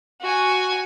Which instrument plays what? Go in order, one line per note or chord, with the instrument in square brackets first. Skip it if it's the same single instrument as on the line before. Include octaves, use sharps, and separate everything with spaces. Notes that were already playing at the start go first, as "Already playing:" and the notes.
[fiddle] F#4 G#5